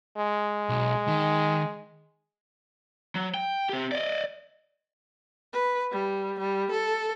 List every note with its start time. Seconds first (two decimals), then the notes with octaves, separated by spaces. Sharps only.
0.18 G#3
0.69 B1
1.08 D#3
3.15 F#3
3.34 G5
3.69 C4 G4
3.92 D5 D#5
5.53 B4
5.92 G3
6.39 G3
6.71 A4